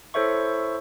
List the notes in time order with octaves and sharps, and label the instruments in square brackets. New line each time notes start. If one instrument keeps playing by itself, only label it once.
[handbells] E4 A4 C5 C#5 E5 C#6